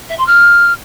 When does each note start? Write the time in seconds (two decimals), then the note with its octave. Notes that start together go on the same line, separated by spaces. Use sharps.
0.09 E5
0.18 C6
0.26 F6